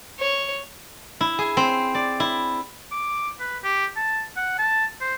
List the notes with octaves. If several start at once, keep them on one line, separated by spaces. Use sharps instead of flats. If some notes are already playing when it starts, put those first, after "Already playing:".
C#5
E4
G#4
C4
D5
E4
D6
B4
G4
A5
F#5
A5
C5